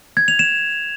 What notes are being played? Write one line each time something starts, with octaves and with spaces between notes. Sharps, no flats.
G#6
F7
E7